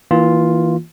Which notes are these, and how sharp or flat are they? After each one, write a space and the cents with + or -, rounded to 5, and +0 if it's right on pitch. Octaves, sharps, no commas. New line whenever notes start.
E3 -20 A#3 +0 F4 +0